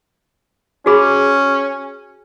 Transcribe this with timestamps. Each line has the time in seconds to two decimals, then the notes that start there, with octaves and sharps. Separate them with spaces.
0.86 C#4 F#4 G#4 B5